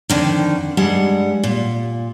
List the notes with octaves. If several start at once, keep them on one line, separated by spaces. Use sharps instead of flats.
F2 D3 D#3
G2 G3 G#3 F#5
A#2